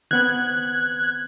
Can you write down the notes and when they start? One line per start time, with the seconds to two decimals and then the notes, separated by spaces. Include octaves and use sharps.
0.11 D#3 B3 C4 F#6 G#6